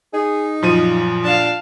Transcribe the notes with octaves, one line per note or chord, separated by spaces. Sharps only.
D#4 G#4
F#2 A#2 F3 D#7
D4 F5 A5